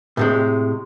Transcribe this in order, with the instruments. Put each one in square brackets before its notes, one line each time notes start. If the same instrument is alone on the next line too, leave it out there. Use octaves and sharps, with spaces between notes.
[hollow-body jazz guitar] A2 C3 G#3